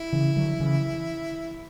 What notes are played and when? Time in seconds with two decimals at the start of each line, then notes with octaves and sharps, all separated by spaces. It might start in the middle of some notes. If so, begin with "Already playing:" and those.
Already playing: E4
0.13 C#3 E3
0.36 D3 F#3
0.60 C#3 E3